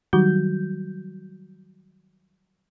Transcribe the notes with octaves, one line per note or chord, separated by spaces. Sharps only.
D#3 F#3 G3 F#4 G6